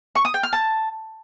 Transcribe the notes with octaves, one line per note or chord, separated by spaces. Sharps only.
C#6
D#6
G5
F6
A5